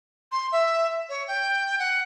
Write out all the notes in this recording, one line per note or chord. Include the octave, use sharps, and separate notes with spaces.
C6
E5
C#5
G5
F#5